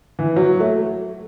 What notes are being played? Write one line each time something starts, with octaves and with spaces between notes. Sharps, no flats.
E3
F#3
A3